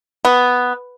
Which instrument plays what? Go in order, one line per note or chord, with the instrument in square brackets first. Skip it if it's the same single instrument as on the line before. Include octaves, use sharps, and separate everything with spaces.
[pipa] B3